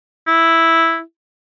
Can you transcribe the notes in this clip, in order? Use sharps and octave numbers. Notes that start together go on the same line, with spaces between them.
E4